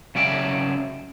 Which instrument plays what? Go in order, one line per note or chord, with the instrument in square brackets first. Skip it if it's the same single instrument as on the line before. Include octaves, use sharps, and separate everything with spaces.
[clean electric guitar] C#3 F#3 C#4 D5 E5 G5